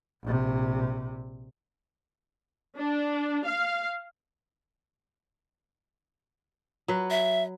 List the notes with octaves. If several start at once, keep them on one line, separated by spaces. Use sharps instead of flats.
A#1 C3
D4
F5
F#3 B4
E5